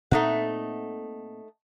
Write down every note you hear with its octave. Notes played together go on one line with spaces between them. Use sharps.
A#2 A3 C4 D#4 F#5